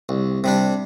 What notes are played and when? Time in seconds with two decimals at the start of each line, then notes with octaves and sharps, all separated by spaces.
0.09 C2
0.44 C3 G3 D4